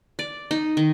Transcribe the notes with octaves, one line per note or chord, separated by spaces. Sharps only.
D5
D#4
D#3